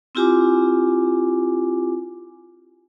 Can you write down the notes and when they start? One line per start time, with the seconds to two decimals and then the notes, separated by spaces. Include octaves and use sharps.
0.15 C4 E4 F4 G4 G#5 D6